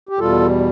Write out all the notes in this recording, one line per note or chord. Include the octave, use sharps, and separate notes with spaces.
G4
E2 B2 G3 F4 A4